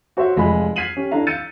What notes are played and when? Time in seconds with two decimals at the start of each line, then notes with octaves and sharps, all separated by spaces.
0.17 F#4 C5 C#5 E5
0.36 F1 G#3 F4 G#5 B5
0.76 F6 G#6 B6 C7 D#7 F#7
0.97 C#4 G4
1.11 D4 E4 A4 E5 F5 A#5
1.27 E6 G6 A6 C#7 D#7